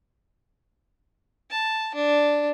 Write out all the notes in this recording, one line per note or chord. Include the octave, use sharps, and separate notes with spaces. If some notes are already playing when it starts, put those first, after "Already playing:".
A5
D4